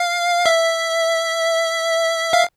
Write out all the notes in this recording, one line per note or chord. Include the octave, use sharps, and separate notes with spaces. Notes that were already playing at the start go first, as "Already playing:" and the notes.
Already playing: F5
E5
F5